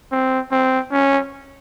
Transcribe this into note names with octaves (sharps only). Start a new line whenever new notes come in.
C4
C4
C#4